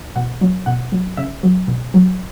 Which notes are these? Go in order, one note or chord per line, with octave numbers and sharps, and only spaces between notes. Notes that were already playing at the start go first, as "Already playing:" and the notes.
B2 F#5
F#3
B2 F#5
F#3
C#3 E5
F#3
B2
F#3